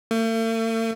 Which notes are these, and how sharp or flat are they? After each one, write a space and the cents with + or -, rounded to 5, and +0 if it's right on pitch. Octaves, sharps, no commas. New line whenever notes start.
A3 +45